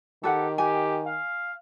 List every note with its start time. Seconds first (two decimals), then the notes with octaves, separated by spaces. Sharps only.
0.24 D#3 G4 A4 B4 F#5
0.58 G4 G#5
1.06 F5